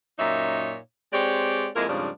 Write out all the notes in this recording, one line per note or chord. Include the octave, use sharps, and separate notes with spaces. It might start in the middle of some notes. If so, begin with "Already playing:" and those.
F#2 A#2 D#4 C#5 E5
G#3 C4 G4 C#5 D5
F2 G#3 A#3 E4 G#4 A#4
F2 G#2 C#3 F3 G3 D4